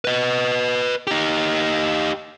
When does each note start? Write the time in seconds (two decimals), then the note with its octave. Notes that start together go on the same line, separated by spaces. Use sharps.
0.05 B4 D#5
1.07 D#4 G4